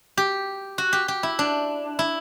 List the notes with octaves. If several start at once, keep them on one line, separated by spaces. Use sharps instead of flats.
G4
F#4
G4
G4
E4
D4
E4